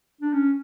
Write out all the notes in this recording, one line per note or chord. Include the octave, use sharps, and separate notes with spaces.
D4
C#4